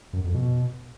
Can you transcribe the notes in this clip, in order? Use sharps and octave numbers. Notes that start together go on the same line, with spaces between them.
F#2
F2
B2